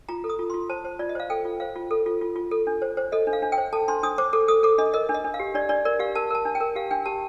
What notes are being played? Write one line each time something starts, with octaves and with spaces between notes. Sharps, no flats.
F4 A#5
A4
D#6
F4
F4 C6
C5 A5
C5
F4 D5
D#5
C5 F5
A4 G5
F4
C5 F5
F4
A4
F4
F4
F4
A4
D4
C5
C5
A4 D#5
D4
F5
D4
G5
C5
A4 A5
D4 C6
D4 D#6
C5 D6
A4 D6
A4 D#6
A4 D6
D4 D#5
A#4 D#5
D4
D#5
D4
F5
G4
D4 D5
D4 D5
A#4 D5
G4 F5
A#4 A5
A#4 A5
D4
G5
A#4
G4 F5
D4 G5
G4 A5